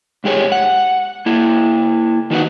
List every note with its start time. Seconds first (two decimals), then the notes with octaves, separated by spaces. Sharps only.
0.24 G#2 G#3 G4 G#4 C#5
0.52 F#5
1.26 A#3 E4
2.30 D#3 D#4 F#4 A4 B4 F#5